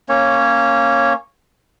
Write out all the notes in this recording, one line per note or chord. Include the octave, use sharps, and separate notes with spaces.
A#3 C#4 C#5